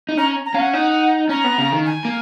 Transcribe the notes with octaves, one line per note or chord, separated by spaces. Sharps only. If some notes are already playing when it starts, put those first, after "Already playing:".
D#4
C#4 A#5
A#5
C#4 F5
F#5
D#4 F#5
C#4 A#5
B3
C#3
D#3
G#5
A#3